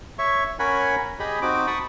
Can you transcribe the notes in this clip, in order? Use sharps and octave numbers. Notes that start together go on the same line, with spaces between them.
C#5 E5 C#6
C#4 A#4 C#5 F#5 G#5 B5
G4 G#4 D#5 B5
C4 D#4 F#4 D6
A5 B5 C#6 D#6